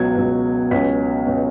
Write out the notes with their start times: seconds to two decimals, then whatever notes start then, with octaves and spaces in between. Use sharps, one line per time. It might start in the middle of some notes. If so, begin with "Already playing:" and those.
Already playing: C#2 B2 F#3 G#6
0.16 C#2 B2 F#3
0.71 C#2 B2 F#3 C#4 B6
1.27 B2 F#3 C#4